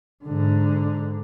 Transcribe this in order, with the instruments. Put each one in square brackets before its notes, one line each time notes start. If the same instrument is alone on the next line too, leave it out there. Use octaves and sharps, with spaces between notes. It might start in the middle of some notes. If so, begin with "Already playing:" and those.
[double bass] G#2 D3